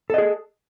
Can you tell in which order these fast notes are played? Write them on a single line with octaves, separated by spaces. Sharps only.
A4 D#5 G#4